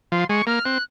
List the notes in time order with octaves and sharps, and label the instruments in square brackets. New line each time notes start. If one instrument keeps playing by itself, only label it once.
[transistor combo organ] F3 [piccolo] C6
[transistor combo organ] G#3 [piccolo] C#6
[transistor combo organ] A#3 [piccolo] F6
[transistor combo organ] C4 [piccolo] F#6